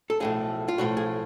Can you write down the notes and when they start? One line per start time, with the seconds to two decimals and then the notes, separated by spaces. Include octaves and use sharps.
0.10 A4
0.20 B1 A2 F3 G#4
0.68 F4
0.78 B1 A2 F3 F#4
0.97 G#4